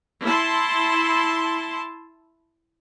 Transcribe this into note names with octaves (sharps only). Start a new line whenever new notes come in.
E4 A5 C6